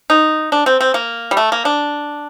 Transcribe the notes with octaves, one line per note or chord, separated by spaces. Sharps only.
D#4
D4
C4
C4
A#3
G3
A3
A#3
D4